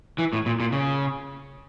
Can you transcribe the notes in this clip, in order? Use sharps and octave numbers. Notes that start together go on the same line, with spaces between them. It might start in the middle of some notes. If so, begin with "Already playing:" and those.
E3
A2
A#2
A#2
C#3